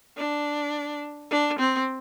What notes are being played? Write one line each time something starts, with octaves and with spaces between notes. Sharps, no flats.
D4
D4
C4